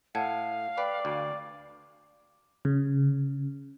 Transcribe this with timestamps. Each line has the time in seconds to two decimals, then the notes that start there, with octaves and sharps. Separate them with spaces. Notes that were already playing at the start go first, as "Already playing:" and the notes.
0.15 A2 F5 F#5 A5 G#6
0.78 B4 D5 G5
1.05 D2
2.65 C#3